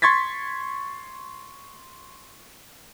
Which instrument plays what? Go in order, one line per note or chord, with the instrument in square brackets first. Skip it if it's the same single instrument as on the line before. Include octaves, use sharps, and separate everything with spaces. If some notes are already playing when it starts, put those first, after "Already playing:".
[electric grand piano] C6 C#6 G#6 A6 B6